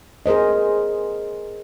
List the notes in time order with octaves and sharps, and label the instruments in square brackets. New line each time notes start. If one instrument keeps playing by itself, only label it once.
[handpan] G#4 A#4 C5 D#5